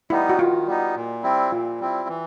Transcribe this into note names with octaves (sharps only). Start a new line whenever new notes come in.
G3 B3 D#4 E4
F#4
D#3 F4
G3 B3 D#4
A#2
G3 C4 E4
A#2 F4
G3 C4 E4
E3